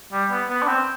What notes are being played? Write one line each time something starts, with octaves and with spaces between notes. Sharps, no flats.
G3
B3
B3
D4
C4